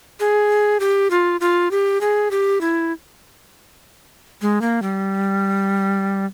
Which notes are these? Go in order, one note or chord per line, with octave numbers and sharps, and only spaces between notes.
G#4
G4
F4
F4
G4
G#4
G4
E4
G#3
A#3
G3